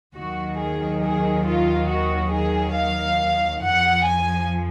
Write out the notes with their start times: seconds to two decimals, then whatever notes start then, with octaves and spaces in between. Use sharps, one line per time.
0.15 D#2 D#3 F#3 F#4
0.58 G#4
1.02 G#4
1.46 F4
1.89 F#4
2.32 G#4
2.76 F5
3.63 F2 F3 F#5
4.05 G#5